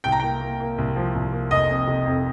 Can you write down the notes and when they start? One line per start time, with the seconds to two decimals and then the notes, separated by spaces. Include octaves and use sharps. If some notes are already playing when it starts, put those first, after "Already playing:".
0.04 C2 G5
0.12 A#5
0.20 A#3 G5
0.41 A#3
0.60 A#3
0.78 C2
0.96 F3
1.15 C2
1.32 A#3
1.51 F1 D#5
1.69 F2
1.87 C3
2.06 F2